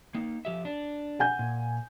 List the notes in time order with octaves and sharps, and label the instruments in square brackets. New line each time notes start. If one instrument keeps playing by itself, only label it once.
[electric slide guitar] A#3 D#4
F3 G4 E5
D4
[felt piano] F#5 G#5 G6
[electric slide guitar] A#2